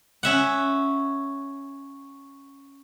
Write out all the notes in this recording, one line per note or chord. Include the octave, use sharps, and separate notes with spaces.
C#4 E5 F#5